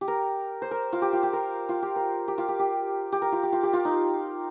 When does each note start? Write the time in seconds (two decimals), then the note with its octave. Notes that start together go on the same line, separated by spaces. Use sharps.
0.01 G4
0.08 A#4
0.62 C5
0.71 A#4
0.93 F4
1.02 G4
1.13 F4
1.23 G4
1.33 A#4
1.69 F4
1.82 G4
1.96 A#4
2.28 G4
2.38 F4
2.48 G4
2.59 G4
3.12 G4
3.22 A#4
3.32 F4
3.43 G4
3.53 F4
3.63 G4
3.73 F4
3.85 D#4